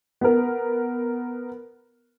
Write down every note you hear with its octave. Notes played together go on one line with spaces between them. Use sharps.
B3 A#4